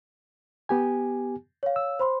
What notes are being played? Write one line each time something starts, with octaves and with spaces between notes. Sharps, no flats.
B3 G4 G#5
C#5 F5
E6
C5 B5 C6